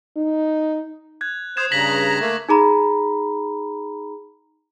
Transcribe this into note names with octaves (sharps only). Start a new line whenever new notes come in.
D#4
F#6 G#6
C5 D#6 G#6 E7
G2 C#3 A#5 A#6 B6 F#7
B6
A3 A#3
D#4 G#4 A#5 B5